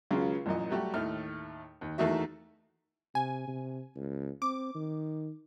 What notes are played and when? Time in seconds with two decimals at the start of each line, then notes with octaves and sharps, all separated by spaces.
0.11 C#2 C#3 F#3 F4 G#4
0.46 A1 F#2 A#2 D#5
0.70 F#3 G3 A3 F#4 G4
0.94 D#2 A2 A3 F6
1.81 D#2
1.98 E2 A3 A#3 D#4 F#4 E5
3.15 C3 G#5
3.48 C3
3.96 C#2
4.42 C4 D6
4.75 D#3